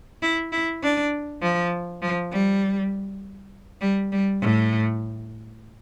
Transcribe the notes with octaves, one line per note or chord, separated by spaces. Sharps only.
E4
E4
D4
F3
F3
G3
G3
G3
A2